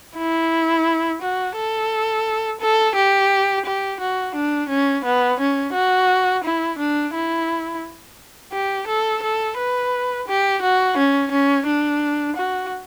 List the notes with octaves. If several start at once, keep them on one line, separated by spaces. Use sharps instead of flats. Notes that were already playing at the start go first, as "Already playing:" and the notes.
E4
F#4
A4
A4
G4
G4
F#4
D4
C#4
B3
C#4
F#4
E4
D4
E4
G4
A4
A4
B4
G4
F#4
C#4
C#4
D4
F#4